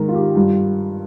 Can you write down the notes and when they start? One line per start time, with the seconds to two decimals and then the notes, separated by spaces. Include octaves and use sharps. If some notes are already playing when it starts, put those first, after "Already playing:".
Already playing: G#2 D#3 G#3 A#4
0.08 F4
0.14 G4
0.36 G2 G3 F4